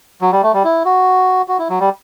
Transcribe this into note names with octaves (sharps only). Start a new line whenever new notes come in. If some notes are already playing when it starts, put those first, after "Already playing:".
F#3
G3
A3
G3
E4
F#4
F#4
E4
F#3
G3